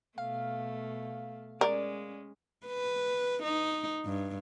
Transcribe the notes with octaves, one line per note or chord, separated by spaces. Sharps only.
B2 A3 F5
G#3 C#4 A#4 D5
B4
D#4
G2